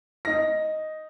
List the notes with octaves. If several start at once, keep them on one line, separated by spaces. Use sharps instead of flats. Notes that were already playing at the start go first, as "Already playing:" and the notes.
D#4 A#6